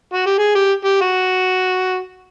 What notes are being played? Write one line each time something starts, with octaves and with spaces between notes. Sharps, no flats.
F#4
G4
G#4
G4
G4
F#4